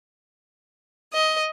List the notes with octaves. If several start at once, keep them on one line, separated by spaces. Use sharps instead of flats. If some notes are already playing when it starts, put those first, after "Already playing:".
D#5